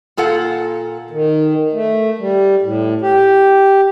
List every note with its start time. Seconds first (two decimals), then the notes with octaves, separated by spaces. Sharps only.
0.17 A#2 F4 A4 F#5
1.10 D#3
1.73 A3
2.18 G3
2.62 A2
3.01 G4